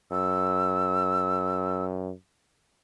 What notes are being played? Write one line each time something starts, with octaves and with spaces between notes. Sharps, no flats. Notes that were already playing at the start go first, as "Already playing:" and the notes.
F#2 E6